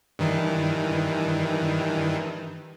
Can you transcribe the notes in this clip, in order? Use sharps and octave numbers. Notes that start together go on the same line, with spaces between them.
G2 D#3 E3